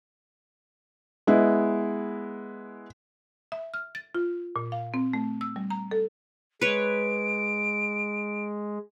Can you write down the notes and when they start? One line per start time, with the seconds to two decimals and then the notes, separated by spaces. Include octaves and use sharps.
1.27 G#3 B3 E4
3.52 E5
3.74 F6
3.95 A6
4.15 F4
4.56 A#2
4.72 F5
4.94 C4
5.13 A3
5.41 E6
5.56 G3
5.70 A#5
5.91 A4
6.61 G#3 B4 C#5 D7